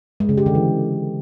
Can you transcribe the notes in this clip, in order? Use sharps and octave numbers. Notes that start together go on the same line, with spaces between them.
G#3
C#3
G4
D3
E3